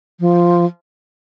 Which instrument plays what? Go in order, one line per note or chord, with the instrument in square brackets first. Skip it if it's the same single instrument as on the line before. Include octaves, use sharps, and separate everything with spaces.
[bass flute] F3